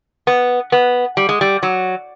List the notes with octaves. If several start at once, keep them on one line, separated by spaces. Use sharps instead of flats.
B3
B3
G3
G#3
G3
F#3